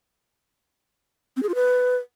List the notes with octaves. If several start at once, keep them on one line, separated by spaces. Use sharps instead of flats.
C4
G#4
F4
B4